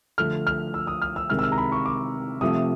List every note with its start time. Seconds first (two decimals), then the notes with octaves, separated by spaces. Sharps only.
0.18 D3 F3 A3 F6
0.47 F6
0.74 E6
0.87 D#6
1.02 F6
1.16 E6
1.30 C3 D#3 G#3 F6
1.39 E6
1.43 F6
1.52 A#5
1.58 B5
1.72 C#6
1.86 D6
2.41 C3 F3 A3 D#6